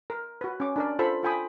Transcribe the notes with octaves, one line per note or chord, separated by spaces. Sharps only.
A#4
F#4 B4
C#4 D6
D4 A#4 D5
F4 A4 C5 B5
F4 A4 G5 G#5 B5 D#6